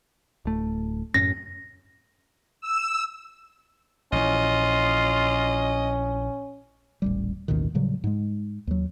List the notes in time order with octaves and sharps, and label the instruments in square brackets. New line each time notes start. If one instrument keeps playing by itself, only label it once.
[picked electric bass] D1 A3
[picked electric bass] F#2 A2 C#4 [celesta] A#6
[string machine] E6
[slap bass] A#1 E3 [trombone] C#4 [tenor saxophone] F4 [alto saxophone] D#5
[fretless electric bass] D#1 A1 G3
A1 D#2 B2 D#3
A2 C#3 F#3 G3
G#2 G#3
D#2 F#3